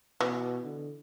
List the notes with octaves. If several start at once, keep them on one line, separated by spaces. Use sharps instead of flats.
B2 E3
D3